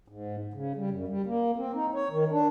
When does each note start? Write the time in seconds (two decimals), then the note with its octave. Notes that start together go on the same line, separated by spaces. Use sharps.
0.08 G#2
0.54 C#3
0.76 G3
0.90 F#2
1.08 G3
1.26 A#3
1.56 C4
1.74 D#4
1.94 C#5
2.11 D#3
2.31 D4